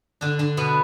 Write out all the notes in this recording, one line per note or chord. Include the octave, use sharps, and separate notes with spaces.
D3 D4
D3 D4
B2 B3